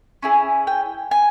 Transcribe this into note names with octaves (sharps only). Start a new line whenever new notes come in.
C#4 E4 G#4
G5
G#5